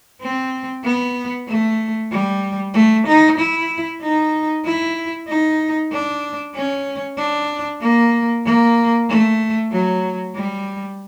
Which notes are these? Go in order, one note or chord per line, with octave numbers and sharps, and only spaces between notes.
C4
B3
A3
G3
A3
D#4
E4
D#4
E4
D#4
D4
C#4
D4
A#3
A#3
A3
F#3
G3